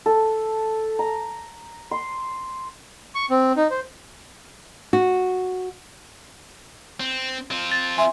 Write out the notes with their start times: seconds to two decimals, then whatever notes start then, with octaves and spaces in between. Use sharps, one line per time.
0.06 A4
0.99 A#5
1.91 C6
3.15 C#6
3.30 C4
3.57 D#4
3.70 C5
4.93 F#4
7.00 C4
7.51 C4 F4
7.72 A6
7.98 E5 G#5 C6